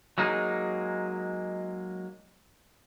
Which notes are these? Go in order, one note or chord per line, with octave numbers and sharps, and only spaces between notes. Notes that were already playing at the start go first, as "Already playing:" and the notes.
F#3 G#3 A#3 D#4 G#4